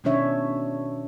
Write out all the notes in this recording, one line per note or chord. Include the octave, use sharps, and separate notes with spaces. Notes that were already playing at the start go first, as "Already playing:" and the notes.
B2 D#3 C#4 D4 C#5 E5